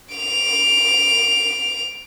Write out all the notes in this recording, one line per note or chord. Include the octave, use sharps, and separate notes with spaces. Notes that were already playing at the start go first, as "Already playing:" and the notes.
D7 F7